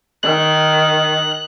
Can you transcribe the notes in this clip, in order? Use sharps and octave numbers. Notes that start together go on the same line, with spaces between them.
D#3 F#6